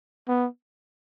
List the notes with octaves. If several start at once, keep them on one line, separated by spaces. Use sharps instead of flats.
B3